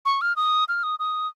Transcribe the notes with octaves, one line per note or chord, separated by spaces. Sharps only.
C#6
F6
D#6
F6
D#6
D#6